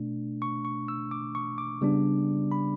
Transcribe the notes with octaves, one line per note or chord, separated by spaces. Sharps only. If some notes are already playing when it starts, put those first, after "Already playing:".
Already playing: B2 A3 D4
C#6
C#6
E6
D6
C#6
D6
C#3 G3 B3 D4
B5